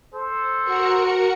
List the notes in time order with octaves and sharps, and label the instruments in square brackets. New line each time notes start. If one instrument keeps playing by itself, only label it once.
[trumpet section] A4 C5
[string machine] F#4 A#4 C#7